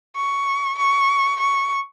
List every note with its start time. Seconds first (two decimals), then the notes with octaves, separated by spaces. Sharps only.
0.16 C#6
0.78 C#6
1.40 C#6